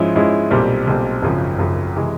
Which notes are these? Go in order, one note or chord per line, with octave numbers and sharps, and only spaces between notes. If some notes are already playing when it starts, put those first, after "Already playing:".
Already playing: G#2 F3 G#3 C#4 E4
G#2 F3 G#3 C#4 E4
B1 A#2 G3 C4
B1 A#2 G3 C4
G#1 F#2 C#3 F3
G#1 F#2 C#3 F3
C3 E3 G#3